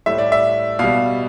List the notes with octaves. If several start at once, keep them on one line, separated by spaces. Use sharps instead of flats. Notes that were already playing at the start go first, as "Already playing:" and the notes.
A2 G3 E5
D5
E5
B2 G3 F5